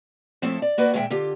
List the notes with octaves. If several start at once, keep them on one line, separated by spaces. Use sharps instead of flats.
F3 A3 C4 E4 A4 C#5
D5
A#3 F#4 B4 D5
A#2 D#3 G#3 C#5 E5 G5
D3 F4 G4